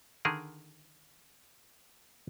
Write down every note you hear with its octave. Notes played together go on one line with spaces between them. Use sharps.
D3 D#3 G#4 A#4